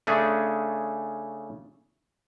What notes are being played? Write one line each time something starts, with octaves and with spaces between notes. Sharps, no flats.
C#3 A3 C#4 D4 G#4